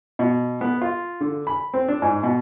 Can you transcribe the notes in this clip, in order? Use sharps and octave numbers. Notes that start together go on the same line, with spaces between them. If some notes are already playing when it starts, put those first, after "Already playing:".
B2
B3
F4
D3
B5
C4
D4
G#2
B2